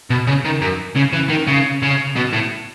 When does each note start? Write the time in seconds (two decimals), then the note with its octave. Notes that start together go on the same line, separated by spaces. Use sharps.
0.10 B2
0.27 C#3
0.45 D#3
0.61 F#2
0.96 C#3
1.13 E3
1.30 D#3
1.48 C#3
1.82 C#3
2.16 B2
2.33 A2